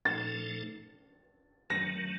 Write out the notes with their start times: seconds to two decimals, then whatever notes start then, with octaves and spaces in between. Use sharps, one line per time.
0.05 A#2 F3 A3 D#4 A4 A6
1.70 F#2 D#3 F#3 A3 A#6